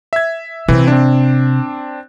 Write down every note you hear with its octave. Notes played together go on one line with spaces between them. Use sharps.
E5 G#6
C3 E3 C4
C4 D4